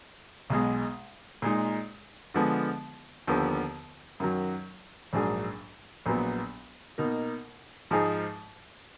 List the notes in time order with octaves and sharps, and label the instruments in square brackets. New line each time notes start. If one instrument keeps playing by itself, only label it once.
[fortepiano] B1 B2 G#3
A#2 G#3 D#4
D3 F3 G#3 B3
D#2 D3 F3 B3
F#2 D#3 F#3
A#1 G#2 F#3 D4 G#4
A#1 A#2 F#3 B3
B2 A#3 D#4
G#2 F3 G#3 D#4 G#4